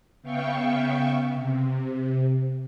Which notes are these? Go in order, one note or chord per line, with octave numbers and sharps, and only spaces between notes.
C#3 B3 E5 F5 G5 C#6
C3